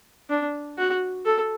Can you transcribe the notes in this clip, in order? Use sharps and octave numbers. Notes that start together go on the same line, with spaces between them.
D4
F#4
A4